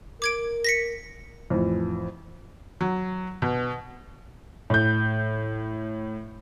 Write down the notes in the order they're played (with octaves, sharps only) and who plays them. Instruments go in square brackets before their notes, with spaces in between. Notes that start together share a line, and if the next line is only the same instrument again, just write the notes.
[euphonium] A#4 [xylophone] D6 G#6 D7
[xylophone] A#6 B6 C#7
[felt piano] F2 A2 E3
F#3
B2
[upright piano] A2 G6